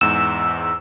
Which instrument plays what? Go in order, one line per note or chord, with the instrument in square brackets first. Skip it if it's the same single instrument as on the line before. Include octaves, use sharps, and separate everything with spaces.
[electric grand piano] E2 G#2 [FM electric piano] E6